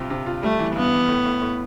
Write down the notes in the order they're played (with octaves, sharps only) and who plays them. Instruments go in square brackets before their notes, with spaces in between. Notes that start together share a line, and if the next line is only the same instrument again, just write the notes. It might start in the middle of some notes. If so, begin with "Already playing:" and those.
Already playing: [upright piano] G2 C3 F4
C3
F4
[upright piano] G3 [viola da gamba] A3
[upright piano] E3
[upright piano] G2 [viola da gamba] B3
[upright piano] E3
A2
A2
A2